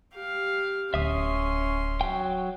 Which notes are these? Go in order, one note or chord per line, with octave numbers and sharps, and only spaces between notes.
G4 F5
D1 C#4 E5 C6 D#6
F#3 G5